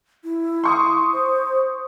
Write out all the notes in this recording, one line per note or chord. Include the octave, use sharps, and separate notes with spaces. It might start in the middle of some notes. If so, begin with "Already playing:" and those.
E4
C6 C#6 D#6
C5